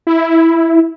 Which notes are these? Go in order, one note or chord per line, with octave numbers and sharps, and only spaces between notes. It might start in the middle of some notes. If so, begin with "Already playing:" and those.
E4